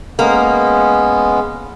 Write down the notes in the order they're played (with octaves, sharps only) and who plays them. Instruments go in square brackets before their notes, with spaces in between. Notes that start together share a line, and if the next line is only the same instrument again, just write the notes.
[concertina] G#3 B3 C#4 [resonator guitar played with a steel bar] A#3